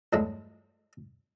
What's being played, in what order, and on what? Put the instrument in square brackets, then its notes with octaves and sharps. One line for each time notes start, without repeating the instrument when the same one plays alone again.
[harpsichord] E2 G2 F#3 G#3 A3